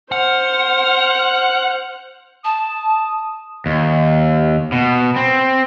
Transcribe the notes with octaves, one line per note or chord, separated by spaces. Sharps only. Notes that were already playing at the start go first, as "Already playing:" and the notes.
C5 F#5 F6
A5 D#6
D#2
B2
C4